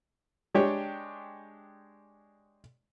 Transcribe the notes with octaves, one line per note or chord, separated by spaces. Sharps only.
G#3 D4 G4 C#5 G5